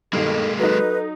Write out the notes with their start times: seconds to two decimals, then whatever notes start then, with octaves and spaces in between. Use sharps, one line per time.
0.13 G2 B2 D#3 G#3 A#3 A4
0.59 F#3 D#4 A4 B4